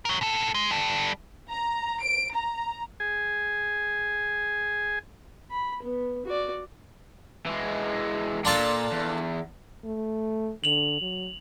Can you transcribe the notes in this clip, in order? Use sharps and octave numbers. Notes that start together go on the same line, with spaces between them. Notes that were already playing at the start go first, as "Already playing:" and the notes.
A#4 C#5
B2 A4
G#3
G3 A4
A#5
D7
A#5
G#4 G#5
B5
B3
F#4 D5
E3 G#3
A#2 D4 F4 A4
E2
A3
D3 F7 F#7
F#3